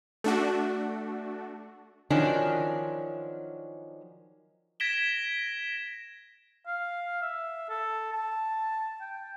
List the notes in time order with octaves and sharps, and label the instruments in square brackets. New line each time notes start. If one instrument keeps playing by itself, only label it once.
[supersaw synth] A3 D4 F#4
[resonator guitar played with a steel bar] D#3 F3 F#3 C#4 D4
[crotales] G#6 A#6 B6 D7 E7 G7
[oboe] F5
E5
A4
A5
G5